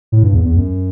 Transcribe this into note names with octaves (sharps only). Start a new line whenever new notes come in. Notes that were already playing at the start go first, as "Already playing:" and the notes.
A2
G2
E2
E2
F#2